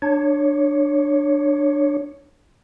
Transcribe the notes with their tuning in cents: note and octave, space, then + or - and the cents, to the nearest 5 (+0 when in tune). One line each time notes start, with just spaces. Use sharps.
D4 +15 C#5 +0